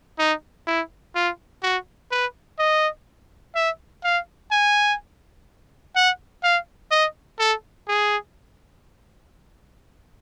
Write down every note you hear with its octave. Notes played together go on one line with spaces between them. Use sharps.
D#4
E4
F4
F#4
B4
D#5
E5
F5
G#5
F#5
F5
D#5
A4
G#4